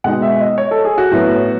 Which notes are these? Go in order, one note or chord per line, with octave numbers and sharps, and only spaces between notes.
B2 G#3 D#4 F#5
E5
D#5
C#5
A4
G#4
F#4
A2 F#3 B3